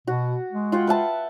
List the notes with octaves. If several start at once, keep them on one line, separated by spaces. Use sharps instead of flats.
B2 F#4
G#3
F4 F#5 G5
B4 E5 A5